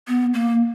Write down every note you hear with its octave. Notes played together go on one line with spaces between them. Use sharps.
B3
A#3